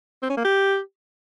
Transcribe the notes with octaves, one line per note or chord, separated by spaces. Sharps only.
C4
C#4
A#3
G4